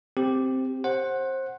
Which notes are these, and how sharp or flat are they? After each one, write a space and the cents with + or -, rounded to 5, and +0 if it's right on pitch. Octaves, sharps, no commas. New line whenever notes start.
C4 +0 G4 +0
C5 +25 F#5 +0